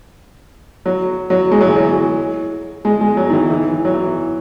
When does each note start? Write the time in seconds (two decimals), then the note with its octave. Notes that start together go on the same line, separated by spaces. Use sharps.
0.86 F#3
1.30 F#3
1.52 G#3
1.61 F#3
1.67 E3
1.76 F#3
2.85 G#3
3.01 G#3
3.17 F#3
3.29 D#3
3.33 E3
3.50 E3
3.72 E3
3.85 F#3
3.94 E3